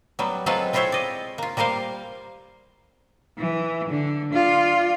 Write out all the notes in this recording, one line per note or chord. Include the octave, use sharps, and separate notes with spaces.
F#3 G3 B3
F#3 G#3 C4 F4 A4 B4
C4 E4 F4 C5 C#5 E5
D5 D#5
A#3 F4
G3 A#3 A#4 C5 F5
E3
D3
F4 D5